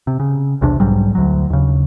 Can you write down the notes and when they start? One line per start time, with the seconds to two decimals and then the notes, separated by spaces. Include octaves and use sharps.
0.07 C3
0.20 C#3
0.61 B1 E2 C3 D4
0.80 B1 G#2 F#3 G3
1.15 D2 F#3
1.50 D#2 C#3